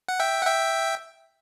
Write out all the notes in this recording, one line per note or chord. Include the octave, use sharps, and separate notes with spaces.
F#5
E5 G5
F#5
E5 G5